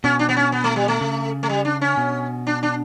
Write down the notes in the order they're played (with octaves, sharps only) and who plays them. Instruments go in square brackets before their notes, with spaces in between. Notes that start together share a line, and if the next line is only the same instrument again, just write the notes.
[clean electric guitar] B2 [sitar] C#4
[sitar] D4
B3
C#4
B3
A3
G3
A3
[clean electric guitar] C#3
[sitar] A3
G3
D4
C#4
[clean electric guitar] B2
[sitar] D4
D4